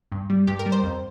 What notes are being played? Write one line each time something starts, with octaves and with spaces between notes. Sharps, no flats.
G2
G3
G2 G4
A#4
G3
C5
F2